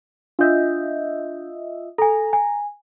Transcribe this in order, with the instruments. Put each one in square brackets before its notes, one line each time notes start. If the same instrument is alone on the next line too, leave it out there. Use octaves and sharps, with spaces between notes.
[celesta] D4 G6 [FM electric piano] F4 D#5 E5
[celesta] A4 G#5 [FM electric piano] A#5
[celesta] G#5